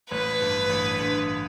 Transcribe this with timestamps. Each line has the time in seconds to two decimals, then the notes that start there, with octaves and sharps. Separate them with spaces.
0.11 A1 B4
0.40 G2 D3
0.70 A1
0.99 G2 D3